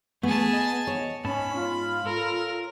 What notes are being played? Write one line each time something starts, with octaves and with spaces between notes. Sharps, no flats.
A3 B3 G#4 A5
D#5
C#5
G#2 B3 C#4 A5 B5
F4
A4 A#4